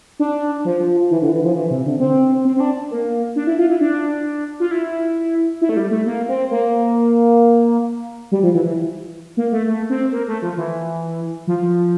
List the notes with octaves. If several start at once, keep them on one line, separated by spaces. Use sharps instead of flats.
D4
F3
E3
D3
E3
F3
E3
C3
D3
C4
C4
C4
D4
A#3
D4
E4
F4
E4
D4
F4
E4
E4
A3
G3
A3
A#3
C4
A#3
G3
F3
E3
E3
A#3
A3
A3
C4
A#3
A3
F3
E3
F3